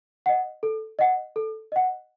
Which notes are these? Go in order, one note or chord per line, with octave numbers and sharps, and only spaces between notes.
D#5 F#5
A4
D#5 F#5
A4
D#5 F#5